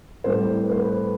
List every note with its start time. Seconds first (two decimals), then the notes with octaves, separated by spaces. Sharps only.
0.24 A2 G3 C4 C5
0.63 B4
0.71 C5
0.80 B4